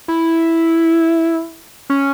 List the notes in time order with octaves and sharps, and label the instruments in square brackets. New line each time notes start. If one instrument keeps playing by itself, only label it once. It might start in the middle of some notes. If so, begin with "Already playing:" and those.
[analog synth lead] E4
C#4